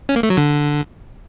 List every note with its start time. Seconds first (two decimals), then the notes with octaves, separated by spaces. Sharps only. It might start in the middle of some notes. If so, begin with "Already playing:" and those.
0.09 C#4
0.16 A#3
0.23 A3
0.30 F#3
0.37 D3